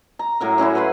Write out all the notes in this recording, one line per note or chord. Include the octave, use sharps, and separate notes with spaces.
A#5
A2 F#3 A#4
F#3 C#4 E4 F#4
B4 F5 B5 C6